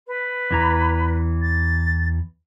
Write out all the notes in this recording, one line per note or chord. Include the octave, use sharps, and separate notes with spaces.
B4
E2 E3 A#5
A6